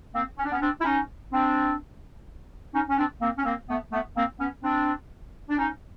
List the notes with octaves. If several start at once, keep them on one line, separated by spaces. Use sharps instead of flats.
A#3 C4
C#4
D4
B3 C#4
C4 D4
E4
C#4 D#4
C4 D4
C#4 D#4
C#4
C4 D4
A#3 C4
C#4
A#3 C4
A3 B3
A3 B3
A#3 C4
B3 C#4
C4 D4
D4
C#4 D#4